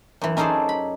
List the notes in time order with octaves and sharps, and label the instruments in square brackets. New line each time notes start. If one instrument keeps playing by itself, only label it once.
[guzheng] F#2 E3
C#4 D#4 G#4 A4 C5 D5
B5